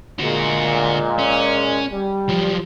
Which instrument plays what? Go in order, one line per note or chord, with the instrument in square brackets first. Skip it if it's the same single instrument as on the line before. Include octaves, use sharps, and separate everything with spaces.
[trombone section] A#2 G#3 [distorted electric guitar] D3 F#4
[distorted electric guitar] C#4
[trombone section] G3
[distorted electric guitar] F3 F#3